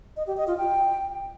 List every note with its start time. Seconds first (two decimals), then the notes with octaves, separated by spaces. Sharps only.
0.17 D#5
0.27 G4
0.37 D#5
0.47 F4
0.58 G5